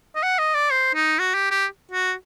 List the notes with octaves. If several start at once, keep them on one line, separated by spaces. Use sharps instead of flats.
D#5
F#5
D#5
D5
C5
D#4
F#4
G4
G4
F#4